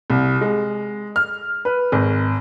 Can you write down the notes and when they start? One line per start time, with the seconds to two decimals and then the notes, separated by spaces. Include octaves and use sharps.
0.10 C2
0.41 G#3
1.16 F6
1.65 B4
1.92 G#1